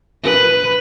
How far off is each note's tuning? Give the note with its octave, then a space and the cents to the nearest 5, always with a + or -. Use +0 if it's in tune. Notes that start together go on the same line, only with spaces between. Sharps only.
B4 +5